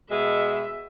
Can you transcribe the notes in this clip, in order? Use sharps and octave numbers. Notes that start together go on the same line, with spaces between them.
B2 G#3 E5